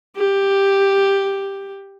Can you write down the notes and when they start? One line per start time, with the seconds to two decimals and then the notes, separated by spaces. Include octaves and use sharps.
0.17 G4